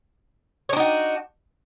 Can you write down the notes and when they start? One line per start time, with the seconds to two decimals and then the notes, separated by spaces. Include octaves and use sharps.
0.69 C#5
0.73 D4
0.76 D#4
0.80 F#4